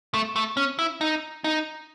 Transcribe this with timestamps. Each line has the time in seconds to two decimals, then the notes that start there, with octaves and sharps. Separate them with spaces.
0.14 A3
0.36 A3
0.57 C#4
0.79 E4
1.01 D#4
1.44 D#4